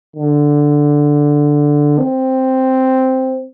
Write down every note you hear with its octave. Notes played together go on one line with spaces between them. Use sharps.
D3
C4